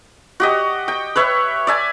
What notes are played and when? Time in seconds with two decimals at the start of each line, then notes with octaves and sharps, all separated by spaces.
0.40 F#4 G4 D#5
0.88 G5
1.16 B4 C#5 E5
1.67 D5 E5 G#5